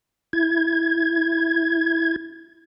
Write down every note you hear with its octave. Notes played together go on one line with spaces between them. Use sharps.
E4 G#6